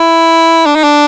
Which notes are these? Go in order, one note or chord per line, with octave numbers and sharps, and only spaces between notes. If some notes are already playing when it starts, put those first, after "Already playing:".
Already playing: E4
D4
D#4
D4